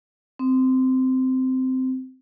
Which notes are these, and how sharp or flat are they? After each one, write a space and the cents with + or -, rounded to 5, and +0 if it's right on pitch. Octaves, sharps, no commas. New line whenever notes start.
C4 -15